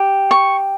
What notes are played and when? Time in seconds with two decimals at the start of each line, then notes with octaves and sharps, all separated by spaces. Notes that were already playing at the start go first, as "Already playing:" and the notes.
Already playing: G4
0.31 C#6